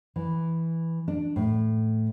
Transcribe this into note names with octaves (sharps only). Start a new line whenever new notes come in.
E3
D4
A2